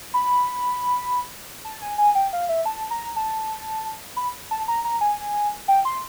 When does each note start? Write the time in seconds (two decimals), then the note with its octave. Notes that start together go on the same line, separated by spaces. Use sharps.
0.14 B5
1.65 A5
1.82 G#5
1.98 G#5
2.15 G5
2.33 F5
2.49 E5
2.66 A5
2.91 A#5
3.16 A5
4.16 B5
4.51 A5
4.68 A#5
4.84 A#5
5.01 G#5
5.68 G5
5.85 C6